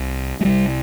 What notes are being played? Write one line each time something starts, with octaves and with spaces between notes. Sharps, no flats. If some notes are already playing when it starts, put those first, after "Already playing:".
Already playing: C2 C3
G#3
C2 C3 G3